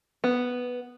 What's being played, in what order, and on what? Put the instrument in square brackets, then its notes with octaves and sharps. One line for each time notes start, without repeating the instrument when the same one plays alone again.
[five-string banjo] B3